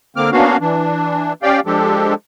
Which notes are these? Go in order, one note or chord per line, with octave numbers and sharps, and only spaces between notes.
D3 A#3 C4 D6 F6
A#3 B3 C#4 D4 F#4 F5
E3 D4
C#4 G4 D5 F5 G5
F3 G#3 D4 G4 A4